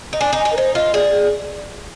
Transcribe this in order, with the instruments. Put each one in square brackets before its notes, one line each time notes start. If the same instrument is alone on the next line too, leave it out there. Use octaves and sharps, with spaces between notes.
[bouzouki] D#4
[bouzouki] D4 [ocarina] G#5
[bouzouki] D#4
[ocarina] G#5
[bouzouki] D#4
[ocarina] A#4
[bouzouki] D#4 [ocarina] C5
[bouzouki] F4 [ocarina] D#5
[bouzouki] G#4 [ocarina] D5